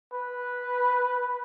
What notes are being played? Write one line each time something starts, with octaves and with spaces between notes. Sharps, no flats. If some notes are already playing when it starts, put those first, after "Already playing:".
B4